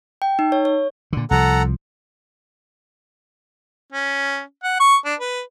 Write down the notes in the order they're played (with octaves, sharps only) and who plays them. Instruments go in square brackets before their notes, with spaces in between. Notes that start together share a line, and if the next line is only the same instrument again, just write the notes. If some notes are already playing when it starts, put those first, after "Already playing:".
[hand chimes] G5
D#4
C#5
C#5
[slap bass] A#2 D3
[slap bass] C2 F3 [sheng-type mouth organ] A4 F#5 A#5
[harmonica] C#4
F#5
C#6
D4
B4